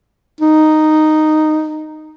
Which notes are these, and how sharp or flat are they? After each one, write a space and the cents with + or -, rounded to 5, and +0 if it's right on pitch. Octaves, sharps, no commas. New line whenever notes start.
D#4 -5